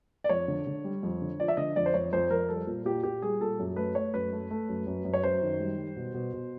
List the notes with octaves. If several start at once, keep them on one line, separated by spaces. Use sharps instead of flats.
D5
F2 C#5
D3
D3
G3
F2
D3
F3 D5
E5
D3 D#5
F2 D5
C5
F2 C#5
F2 C5
F2 A#4
G3 A4
A#2
A#2 G4
A#2 G4
G3 G#4
A#2 A4
F#2
A3 B4
A3 C#5
F#2 B4
A3
A3
F#2
F#2
F#2
C#5
F#2 C5
D#3
G3
G3
B2
B2
B2